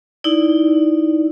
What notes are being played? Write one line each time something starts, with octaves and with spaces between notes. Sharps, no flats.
D#4 E4 D5